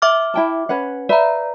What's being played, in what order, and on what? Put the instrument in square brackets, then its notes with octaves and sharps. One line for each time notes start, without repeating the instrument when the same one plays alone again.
[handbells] E5 D6 F6
[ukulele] E4 G5 A5
C#4 B4 F#5
[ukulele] B4 E5 F5 [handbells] D5 A#5